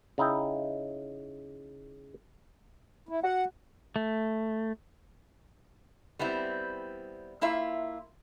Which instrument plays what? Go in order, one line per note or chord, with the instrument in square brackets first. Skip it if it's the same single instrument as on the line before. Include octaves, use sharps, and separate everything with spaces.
[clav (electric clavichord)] C#3 D#4 E4 G5
[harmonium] E4
[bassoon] F#4 [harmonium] F#5
[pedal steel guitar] A3
[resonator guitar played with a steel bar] G3 B3 C4 E4
A#3 E4 F4 E5